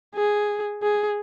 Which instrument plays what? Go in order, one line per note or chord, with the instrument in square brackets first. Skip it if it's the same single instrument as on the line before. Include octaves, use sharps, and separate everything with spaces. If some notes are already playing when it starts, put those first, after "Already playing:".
[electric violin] G#4
G#4